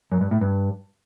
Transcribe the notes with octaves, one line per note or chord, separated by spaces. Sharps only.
F#2
G2
A2
G2